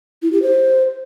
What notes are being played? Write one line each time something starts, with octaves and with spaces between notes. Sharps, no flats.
E4
G4
C5